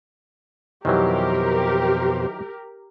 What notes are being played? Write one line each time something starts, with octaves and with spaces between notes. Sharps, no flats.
F2 B2 D#3 E3 F#3 G4 A#4 C5